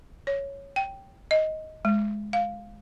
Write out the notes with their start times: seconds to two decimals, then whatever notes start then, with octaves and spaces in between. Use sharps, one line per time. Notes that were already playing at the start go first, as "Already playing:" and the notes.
0.27 C#5
0.76 G5
1.31 D#5
1.85 G#3
2.33 F5